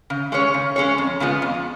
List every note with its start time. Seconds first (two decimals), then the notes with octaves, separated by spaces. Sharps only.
0.10 C#3
0.32 G#3 C#4 G#4 C#5
0.54 C#3
0.76 G#3 C#4 G#4 C#5
0.98 F2
1.20 C#3 G#3 B3 F4
1.42 F2